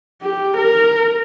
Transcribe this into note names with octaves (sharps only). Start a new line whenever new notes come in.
G4
A#4